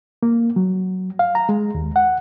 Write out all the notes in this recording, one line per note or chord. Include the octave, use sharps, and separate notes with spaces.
A#3
F#3
F5
A#5
G#3
D#2
F#5